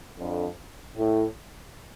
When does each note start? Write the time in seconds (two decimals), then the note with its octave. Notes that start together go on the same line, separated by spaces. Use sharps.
0.18 F2 D3
0.96 A2